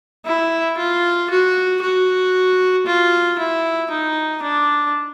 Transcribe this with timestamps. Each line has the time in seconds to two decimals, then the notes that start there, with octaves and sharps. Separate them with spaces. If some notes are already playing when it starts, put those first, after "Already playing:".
0.26 E4
0.77 F4
1.30 F#4
1.82 F#4
2.86 F4
3.38 E4
3.90 D#4
4.42 D4